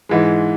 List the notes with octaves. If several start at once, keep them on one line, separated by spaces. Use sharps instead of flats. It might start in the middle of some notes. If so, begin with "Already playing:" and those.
G#2 E3 G#3